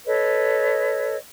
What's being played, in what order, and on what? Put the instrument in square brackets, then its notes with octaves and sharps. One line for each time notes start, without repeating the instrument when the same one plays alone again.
[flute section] A4 B4 C#5 D#5